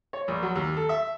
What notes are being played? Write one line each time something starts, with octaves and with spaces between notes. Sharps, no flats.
C#5
A#1
F#3
D#2
A4
E5